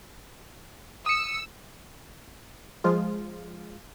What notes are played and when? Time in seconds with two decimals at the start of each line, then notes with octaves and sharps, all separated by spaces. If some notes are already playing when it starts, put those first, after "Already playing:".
1.06 D#6 E6 C#7
2.84 F3 G#3 F4